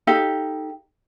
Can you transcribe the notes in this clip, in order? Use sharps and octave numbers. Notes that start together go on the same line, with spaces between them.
D#4 G4 A4 F5